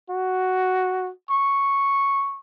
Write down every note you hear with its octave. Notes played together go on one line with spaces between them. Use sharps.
F#4
C#6